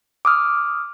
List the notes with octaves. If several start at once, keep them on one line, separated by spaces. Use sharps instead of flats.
D6 D#6 F6